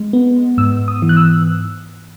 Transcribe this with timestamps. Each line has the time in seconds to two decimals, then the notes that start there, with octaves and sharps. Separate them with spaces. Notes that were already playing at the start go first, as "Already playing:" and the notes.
Already playing: G#3
0.13 B3
0.58 G#2 E6
0.88 D#6
1.02 E3
1.09 F#6
1.17 E6